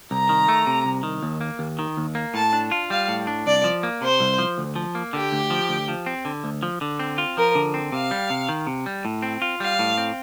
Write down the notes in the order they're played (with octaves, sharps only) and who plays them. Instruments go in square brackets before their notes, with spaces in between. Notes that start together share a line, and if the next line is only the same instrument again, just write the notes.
[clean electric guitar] C2 [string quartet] A#5
[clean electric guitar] D#3
A3
C3
C2
D#3
D#2
A#3
D#2
D#3
D#2
A#3
[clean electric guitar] A2 [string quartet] A5
[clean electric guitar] D4
F4
[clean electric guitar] G3 [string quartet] F5
[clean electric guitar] A2
D4
[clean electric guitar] C2 [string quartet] D5
[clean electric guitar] F3
A#3
[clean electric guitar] C3 [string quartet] C5
[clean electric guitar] C2
F3
D2
F3
A#3
[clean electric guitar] D3 [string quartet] G4
[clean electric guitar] D2
F3
D2
F3
C4
D3
D2
F3
D3
C4
F4
[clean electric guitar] F3 [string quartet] A#4
[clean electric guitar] D3
C4
[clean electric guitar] C3 [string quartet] F5
[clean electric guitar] G3
C3
D#3
C3
G3
A2
C4
F4
[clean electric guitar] G3 [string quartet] F5
[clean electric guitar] A2
C4